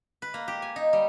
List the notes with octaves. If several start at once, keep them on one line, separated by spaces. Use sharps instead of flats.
B4
A#3
G4
G#5
D#4
G3